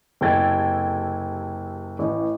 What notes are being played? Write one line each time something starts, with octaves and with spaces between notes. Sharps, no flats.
F#1 C3 A4 G5 G#6 A6
A1